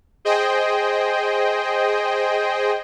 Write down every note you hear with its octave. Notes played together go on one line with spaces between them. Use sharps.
G#4 C5 D#5 G5